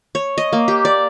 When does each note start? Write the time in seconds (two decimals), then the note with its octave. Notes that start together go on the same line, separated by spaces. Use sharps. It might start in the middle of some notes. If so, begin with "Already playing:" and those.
0.15 C#5
0.38 D#5
0.53 A#3
0.68 G4
0.85 D5